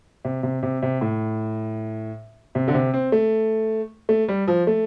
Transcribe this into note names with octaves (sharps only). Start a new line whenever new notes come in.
C3
C3
C3
C3
A2
C3
D3
C3
C4
A3
A3
G3
F3
A3